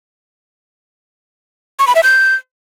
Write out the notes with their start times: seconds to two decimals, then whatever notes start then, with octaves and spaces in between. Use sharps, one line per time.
1.79 C#6
1.87 B5
1.95 E5
2.03 G6